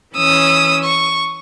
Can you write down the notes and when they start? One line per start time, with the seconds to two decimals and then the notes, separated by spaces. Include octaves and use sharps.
0.15 E3 C#4 D#6 E6
0.84 C#6